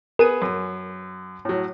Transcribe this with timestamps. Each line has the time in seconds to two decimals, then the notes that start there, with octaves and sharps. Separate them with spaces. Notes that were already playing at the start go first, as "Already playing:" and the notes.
0.19 B3 G#4 A#4 B4 D#7
0.42 F#2
1.45 A2 F#3